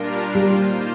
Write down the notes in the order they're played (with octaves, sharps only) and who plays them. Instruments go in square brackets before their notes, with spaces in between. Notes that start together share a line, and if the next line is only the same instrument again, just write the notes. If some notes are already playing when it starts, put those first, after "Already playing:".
Already playing: [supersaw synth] A#2 G3 D4 F4 A#4
[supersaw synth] D#3 A#3 F4 C5 [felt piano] G3